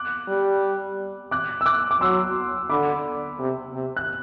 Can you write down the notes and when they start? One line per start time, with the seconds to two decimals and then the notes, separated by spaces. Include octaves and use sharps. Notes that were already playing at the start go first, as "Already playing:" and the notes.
Already playing: D6 F#6
0.28 G3
1.31 D6 F#6
1.61 E6
1.66 D6 F#6
1.91 D6
2.01 F#3 C6 E6
2.70 D3 B5 D6
3.39 C3
3.74 C3
3.97 F#6